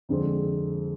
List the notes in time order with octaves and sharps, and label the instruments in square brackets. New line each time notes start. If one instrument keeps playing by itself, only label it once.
[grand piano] F2 D3 G#3 C4